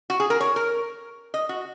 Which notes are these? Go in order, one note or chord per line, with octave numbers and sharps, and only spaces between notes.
F#4
G#4
A#4
C#5
A#4
D#5
F#4